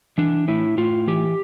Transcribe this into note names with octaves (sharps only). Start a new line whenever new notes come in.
E3 D4
A2 E4
A2 F4
E3 G4